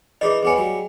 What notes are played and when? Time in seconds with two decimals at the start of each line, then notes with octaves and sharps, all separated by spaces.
0.21 E3 D4 D#4 G#4 D#5
0.43 E2 B3 G#4 C#5 G#5
0.56 F#3 G3